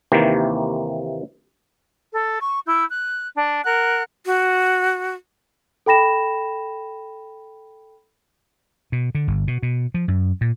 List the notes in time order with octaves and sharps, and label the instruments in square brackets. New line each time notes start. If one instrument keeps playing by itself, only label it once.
[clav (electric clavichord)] D#2 C3 D#3 E3 A#3
[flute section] A4
C#6
E4 E6 G6
F#6
D4
A#4 F#5 F#6
[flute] F#4
[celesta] A4 G5 B5 A#6 E7
[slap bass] B2
D3
G1
B2
B2
F3
F#2
A#2